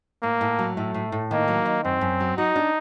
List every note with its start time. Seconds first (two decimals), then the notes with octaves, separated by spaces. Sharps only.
0.22 A2 A#3
0.41 A2
0.59 F#3
0.77 A2 A3
0.94 A2
1.12 A2
1.31 D#3 A#3
1.48 F#3
1.65 D#3
1.84 F#2 C4
2.01 F#2
2.20 F#3
2.38 D#4 F#4
2.56 D4